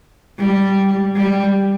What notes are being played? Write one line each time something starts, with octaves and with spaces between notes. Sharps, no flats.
G3
G3